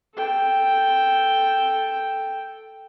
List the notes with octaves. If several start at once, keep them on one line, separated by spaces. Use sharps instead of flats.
A4 G5